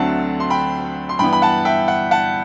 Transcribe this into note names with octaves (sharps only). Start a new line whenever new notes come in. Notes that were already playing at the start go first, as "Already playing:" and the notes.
Already playing: D2 D3 F#3 A3 C4 F#5 A5
C6
G5 B5
C6
G2 E3 B3 G5 B5
B5
F#5 A5
E5 G5
F#5
F#5 A5